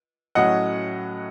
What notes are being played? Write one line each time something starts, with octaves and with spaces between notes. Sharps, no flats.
A2 F#3 C#4 D#5 F#5